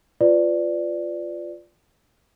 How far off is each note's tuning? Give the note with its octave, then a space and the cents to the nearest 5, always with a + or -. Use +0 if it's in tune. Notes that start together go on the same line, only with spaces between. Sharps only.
F4 +0 B4 +30 D5 +0